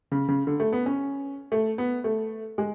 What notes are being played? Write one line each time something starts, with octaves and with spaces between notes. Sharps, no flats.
C#3
C#3
D3
A3
B3
C#4
A3
B3
A3
G#3